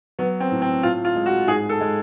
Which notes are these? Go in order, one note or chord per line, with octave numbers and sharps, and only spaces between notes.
F#3 B3
C4
A2
C4
A2 F4
F4
G#3
F#4
G#2 G#4
A4
G#3